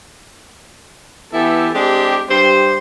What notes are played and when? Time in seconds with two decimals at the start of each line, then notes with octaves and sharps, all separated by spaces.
1.33 E3 B3 E4 G4 A4
1.73 G#3 C4 D4 G4
2.30 G2 G4 C5